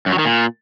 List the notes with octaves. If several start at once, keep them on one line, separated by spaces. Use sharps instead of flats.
F#2
F#3
D#3
A#2